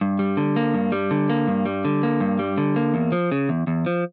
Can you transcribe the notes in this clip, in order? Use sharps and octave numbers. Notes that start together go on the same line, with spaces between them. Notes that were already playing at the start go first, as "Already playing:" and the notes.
G2
G3
D3
A#3
G2
G3
D3
A#3
G2
G3
D3
A#3
G2
G3
D3
A#3
E2
F3
C#3
E2
E2
F3